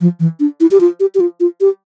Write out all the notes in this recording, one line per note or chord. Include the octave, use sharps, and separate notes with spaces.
F3
E3
D4
E4
G4
F4
G4
G4
F4
F4
G4